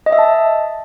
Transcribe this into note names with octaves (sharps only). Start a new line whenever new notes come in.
D#5
E5
A5